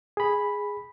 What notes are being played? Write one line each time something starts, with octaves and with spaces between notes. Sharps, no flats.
G#4 B5